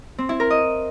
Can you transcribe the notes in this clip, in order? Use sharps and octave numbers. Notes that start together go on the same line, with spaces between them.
C4
E4
A#4
D#5